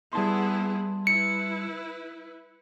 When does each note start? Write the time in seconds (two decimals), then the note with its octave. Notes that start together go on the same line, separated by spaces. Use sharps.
0.13 G3 B3 E4 G#4 A5 C6
1.07 E4 B4 C#7